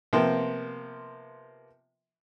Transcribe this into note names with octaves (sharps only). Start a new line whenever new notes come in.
C3 F3 A#3 B3 G5